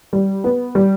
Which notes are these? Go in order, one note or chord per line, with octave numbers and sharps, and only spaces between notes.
G3
B3
G3